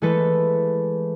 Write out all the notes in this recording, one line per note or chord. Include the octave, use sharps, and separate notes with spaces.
E3 G#3 A3 A4 B4